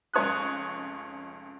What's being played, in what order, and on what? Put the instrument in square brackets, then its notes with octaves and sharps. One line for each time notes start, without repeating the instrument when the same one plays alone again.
[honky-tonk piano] F1 C#2 C#5 D#6 F#6